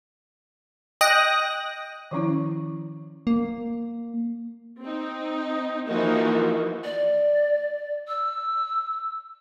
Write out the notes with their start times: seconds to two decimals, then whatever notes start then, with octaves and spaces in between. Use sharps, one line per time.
1.01 D#5 G5 D#6 F#6 A#6
2.11 D#3 F3 C#4 E4
3.27 A#3
4.80 C4 D#4
5.86 E3 F3 A#3 D#4 F#4
6.84 D5
8.08 E6